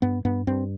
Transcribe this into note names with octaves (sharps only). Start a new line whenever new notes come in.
G2 B3
G2 B3
G2 C4